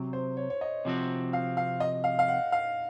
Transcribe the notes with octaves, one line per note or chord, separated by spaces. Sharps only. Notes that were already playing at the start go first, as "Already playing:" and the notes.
Already playing: C3 F#3 C4
C5
C#5
C#5
D#5
C3 F3 C4 F#4
F5
F5
D#5
F5
F5
F#5
F5